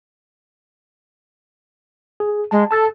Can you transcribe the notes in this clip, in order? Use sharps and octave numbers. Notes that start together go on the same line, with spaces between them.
G#4
G#3 A5
A4 A5 E6 A6